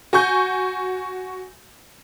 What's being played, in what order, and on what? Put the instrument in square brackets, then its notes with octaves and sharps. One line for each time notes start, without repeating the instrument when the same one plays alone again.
[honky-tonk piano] F#4 G#5 C#6 G6